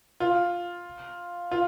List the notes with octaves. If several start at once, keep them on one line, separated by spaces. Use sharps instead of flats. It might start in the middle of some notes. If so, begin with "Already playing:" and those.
F4
F4